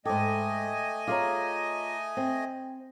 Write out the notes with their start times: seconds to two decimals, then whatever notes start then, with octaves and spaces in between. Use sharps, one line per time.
0.05 G#2 A3 A4 D#5 G5 G#5 D6 D#6
1.07 F4 G#4 C#5 A#5 D6
2.17 C4 G5